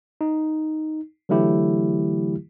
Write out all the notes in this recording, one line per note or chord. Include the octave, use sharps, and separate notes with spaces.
D#4
D3 E3 F#3 A3 E4 G4